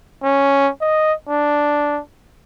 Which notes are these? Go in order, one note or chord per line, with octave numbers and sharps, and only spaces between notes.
C#4
D#5
D4